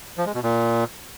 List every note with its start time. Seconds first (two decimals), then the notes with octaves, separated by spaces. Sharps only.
0.18 F3
0.26 G#3
0.35 B2
0.43 A#2